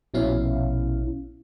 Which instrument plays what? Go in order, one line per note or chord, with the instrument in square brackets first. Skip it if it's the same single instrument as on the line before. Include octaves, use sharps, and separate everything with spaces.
[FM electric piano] A#1 B2 C#4 E4 F5